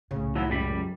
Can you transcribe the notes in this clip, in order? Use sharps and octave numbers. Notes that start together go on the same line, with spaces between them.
C2 A2 C#3
D#2 F3 F#3 E4
C#2 F#2 G3 B5